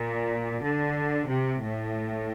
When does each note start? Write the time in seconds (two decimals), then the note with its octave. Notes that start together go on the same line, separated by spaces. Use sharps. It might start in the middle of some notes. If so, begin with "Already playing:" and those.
Already playing: A#2
0.63 D3
1.28 C3
1.62 A2